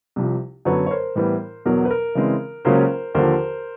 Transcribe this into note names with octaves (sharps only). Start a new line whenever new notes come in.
C2 C3 F3
F#2 D3 F#3 B3 B4 C#5
C#5
A#4 C5
A2 E3 G3 B3
E2 B2 F#3 A#4
B4
A#4
C#3 E3 G#3 C4
C#2 C#3 F#3 A#3 C#4 A#4 C5
D#2 D3 F3 A#4 C5